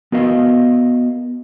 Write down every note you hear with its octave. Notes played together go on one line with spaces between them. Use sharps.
B3 F#4 A#4 D#5 F5